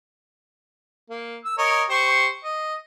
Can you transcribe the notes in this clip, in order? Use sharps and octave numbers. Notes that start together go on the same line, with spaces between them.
A#3
E6
A#4 C#5 D#5
G4 C5 C#6
D#5